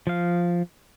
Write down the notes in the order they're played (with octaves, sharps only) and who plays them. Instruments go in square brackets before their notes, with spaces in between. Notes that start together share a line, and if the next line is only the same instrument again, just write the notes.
[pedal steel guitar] F3 F5